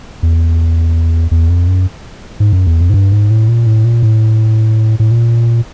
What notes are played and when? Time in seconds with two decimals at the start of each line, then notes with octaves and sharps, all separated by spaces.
0.23 E2
1.31 E2
1.49 F2
1.67 F#2
2.40 G#2
2.53 F#2
2.67 E2
2.80 F2
2.90 G#2
2.94 G2
3.12 G#2
3.30 A2
3.49 A#2
3.66 A2
3.85 A#2
4.03 A2
4.99 A2
5.11 A#2